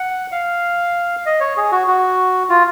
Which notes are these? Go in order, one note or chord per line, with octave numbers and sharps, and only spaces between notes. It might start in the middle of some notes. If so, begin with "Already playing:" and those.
Already playing: F#5
F5
D#5
C#5
G#4
F#4
F#4
F4